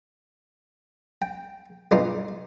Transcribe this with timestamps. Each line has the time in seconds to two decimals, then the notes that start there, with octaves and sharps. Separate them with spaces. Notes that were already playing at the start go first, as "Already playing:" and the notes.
1.22 G5
1.91 B1 G2 D4 D#4 F4 C5